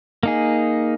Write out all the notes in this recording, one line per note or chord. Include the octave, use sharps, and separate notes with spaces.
A#3 D#4 G#4